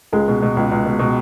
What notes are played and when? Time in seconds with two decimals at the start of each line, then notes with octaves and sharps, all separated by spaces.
0.13 C#2 G#3
0.28 B2
0.42 B2
0.57 C#2
0.72 C#2
0.86 B2
0.99 B2